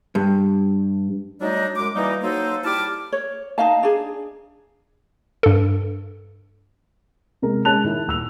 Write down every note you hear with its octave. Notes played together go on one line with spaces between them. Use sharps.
G2
F#3 G3 A3 D4 D#4
F#2 G#3 D6
E3 G3 A#3 D#4
F#3 A#3 D#4 A4 C5
G3 E4 A5 D6 F6
C#5
D#4 D#5 F5 A5
D4 G#4
G2 A4
C3 G#3 A#4
G#3 C#4 C#5 A5 F#6 F7
D#3 E4
D#1 E6 F7